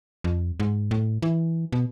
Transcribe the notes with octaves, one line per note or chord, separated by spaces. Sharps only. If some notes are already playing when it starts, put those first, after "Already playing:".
F2
G#2
A2
E3
B2